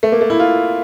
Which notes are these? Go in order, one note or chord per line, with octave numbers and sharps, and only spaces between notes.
A3
A#3
A3
E4
F4